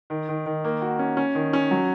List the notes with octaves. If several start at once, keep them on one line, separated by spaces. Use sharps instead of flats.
D#3
D#3
D#3
A#3
F#4
C#4
C#4
D#3
C#4
F#3